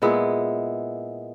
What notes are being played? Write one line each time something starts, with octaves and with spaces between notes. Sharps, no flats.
A#2 G#3 B3 E4